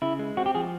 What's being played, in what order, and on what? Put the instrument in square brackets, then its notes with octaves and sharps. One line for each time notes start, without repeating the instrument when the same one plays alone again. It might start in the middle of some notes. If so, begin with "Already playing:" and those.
[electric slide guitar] C#3 [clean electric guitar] E4
[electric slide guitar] G#3
[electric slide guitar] C4 [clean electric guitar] F#4
[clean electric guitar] G4
[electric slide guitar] F3 [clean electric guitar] G#4